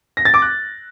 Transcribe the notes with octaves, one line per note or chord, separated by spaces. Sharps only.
A#6
A6
D6
F#6